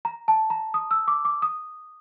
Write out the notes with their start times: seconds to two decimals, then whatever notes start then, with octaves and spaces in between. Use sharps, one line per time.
0.05 A#5
0.28 A5
0.50 A#5
0.74 D#6
0.91 E6
1.08 D6
1.25 D6
1.42 D#6